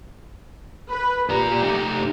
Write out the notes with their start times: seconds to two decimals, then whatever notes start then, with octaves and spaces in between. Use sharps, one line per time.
0.90 B4
1.29 A#2 G4 A#5
1.62 A3 D#4